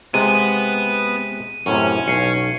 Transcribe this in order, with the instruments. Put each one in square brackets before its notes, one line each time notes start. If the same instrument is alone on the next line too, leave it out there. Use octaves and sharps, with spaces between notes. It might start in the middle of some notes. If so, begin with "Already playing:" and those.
[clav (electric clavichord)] C3 G#3 [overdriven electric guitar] B3 [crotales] D#7
[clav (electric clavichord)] F#2 A2 C3 [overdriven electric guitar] C#4
[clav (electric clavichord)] B1 [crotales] C7 C#7